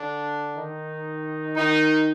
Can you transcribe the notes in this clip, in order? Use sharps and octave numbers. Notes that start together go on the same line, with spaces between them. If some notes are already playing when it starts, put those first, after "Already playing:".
Already playing: D3 D4
D#3 D#4
D#3 D#4